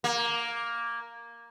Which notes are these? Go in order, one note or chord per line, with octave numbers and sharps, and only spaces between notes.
A#3